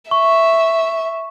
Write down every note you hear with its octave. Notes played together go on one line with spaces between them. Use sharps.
E5 C#6